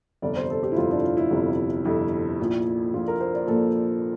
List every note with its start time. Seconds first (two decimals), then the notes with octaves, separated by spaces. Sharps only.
0.22 G1 F2 C3 D5
0.36 C5
0.50 A4
0.63 G4
0.72 E4
0.77 G1 F2 C3 F4
0.91 D4
1.03 F4
1.17 E4
1.30 G1 F2 C3
1.85 G1 F2 C3 E4
2.40 A#1 A#2 F3
2.94 A#1 A#2 F3 F4
3.08 A#4
3.20 C5
3.34 D5
3.47 A#1 A#2 F3 A4